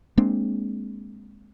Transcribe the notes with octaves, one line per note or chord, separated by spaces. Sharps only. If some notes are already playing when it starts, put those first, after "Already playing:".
G#3 A#3 C4 D4